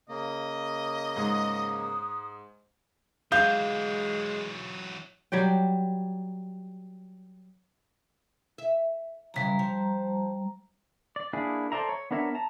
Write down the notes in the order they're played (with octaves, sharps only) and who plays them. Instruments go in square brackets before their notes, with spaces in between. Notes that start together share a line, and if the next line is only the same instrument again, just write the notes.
[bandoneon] C#3 A#3 [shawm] D#5
[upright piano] G#2 [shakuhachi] D#6
[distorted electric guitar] E3 F#3 [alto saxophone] G#3 [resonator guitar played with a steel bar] F5 [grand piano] G6
[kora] F#3 G3 D5 G5
[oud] E5
[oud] F#2 C#3 E3 [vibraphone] G3 A#5
[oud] F3
[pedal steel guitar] D5
A#3 D4 E4 G#4
A4 C5 D5 E5 A#5
C#5
B3 D4 A#4 C#5 E5
A5 A#5